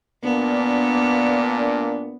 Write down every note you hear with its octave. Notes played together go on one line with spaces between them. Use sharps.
A#2 A#3 B3 D4